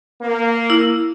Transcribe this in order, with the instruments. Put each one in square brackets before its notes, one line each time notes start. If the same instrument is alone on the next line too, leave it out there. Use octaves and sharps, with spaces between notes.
[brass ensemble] A#3
[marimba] E4